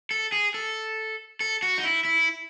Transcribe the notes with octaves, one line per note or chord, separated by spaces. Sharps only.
A4
G#4
A4
A4
F#4
D#4
E4
E4